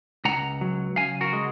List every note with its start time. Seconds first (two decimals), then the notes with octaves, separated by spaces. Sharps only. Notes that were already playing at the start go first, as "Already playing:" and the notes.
0.25 C#2 F#5 A#5
0.61 F#3
0.96 C#3 F5 G#5
1.21 F#4 A#4
1.33 G#3